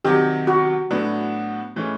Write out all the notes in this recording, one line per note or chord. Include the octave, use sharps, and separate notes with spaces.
C3 D#3 F#3 G4
F#4
A2 F#3 B3 D4
A2 E3 G#3 C#4